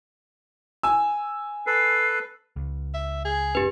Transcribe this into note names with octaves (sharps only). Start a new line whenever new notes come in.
G#5 E6
A4 B4 C7
C#2
E5
G#4
F1 G#2 C#4 G4 B4